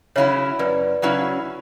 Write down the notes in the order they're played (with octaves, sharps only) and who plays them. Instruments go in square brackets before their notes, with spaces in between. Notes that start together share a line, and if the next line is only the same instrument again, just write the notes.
[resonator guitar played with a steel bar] C#3 F#3 C#4 E4 [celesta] C#5 E5
[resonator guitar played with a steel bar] F#2 [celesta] B4 D5
[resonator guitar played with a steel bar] C#3 F#3 C#4 E4